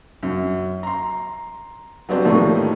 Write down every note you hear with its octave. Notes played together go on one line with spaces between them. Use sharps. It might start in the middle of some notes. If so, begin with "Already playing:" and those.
F#2
A#5 C6
F#3 G3 B3 C4 D4
A2 D#3 F3 G3 A3 A#3